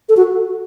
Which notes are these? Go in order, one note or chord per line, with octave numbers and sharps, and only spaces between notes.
A4
F#4